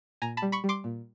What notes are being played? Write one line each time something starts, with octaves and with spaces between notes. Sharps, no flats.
A#2 G#5 A#5
A5 B5
G3
B5 C#6
G3
C6 D6
A#2